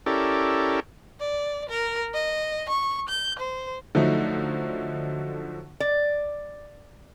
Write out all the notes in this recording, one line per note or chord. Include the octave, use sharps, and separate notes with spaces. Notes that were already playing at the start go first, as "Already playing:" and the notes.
C#4 E4 G4 A4 A#4 D5
D5
A#4
D#5
C#6
G6
C5
D3 F3 F#3 A3 D#4
D5